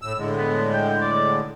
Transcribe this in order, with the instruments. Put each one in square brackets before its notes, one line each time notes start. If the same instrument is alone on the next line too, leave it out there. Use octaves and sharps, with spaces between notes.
[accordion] A2 E6
A2 D3 G#3
[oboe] B3
G5
D5